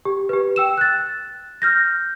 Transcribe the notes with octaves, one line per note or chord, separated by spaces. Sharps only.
G4
G4 B4
G5 E6 E7
F#6 A6
F6 G6 A#6